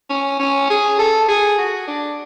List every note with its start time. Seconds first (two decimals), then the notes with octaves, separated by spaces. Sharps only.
0.10 C#4
0.39 C#4
0.70 G#4
0.99 A4
1.29 G#4
1.58 F#4
1.87 D4